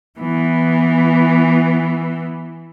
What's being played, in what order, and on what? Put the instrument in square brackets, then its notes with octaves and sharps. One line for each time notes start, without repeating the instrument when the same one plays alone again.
[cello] E3 B3